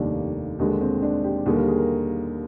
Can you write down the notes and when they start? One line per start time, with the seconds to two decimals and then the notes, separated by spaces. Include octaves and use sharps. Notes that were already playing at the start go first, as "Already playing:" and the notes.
Already playing: F1 D#2 D#3 G3 A#3 D4
0.59 D#2 D3 G#3 D#4
0.81 C4
1.02 D4
1.24 G4
1.46 D#2 D3 G3 A#3 G#4
1.57 A#4
1.67 G#4
1.78 A#4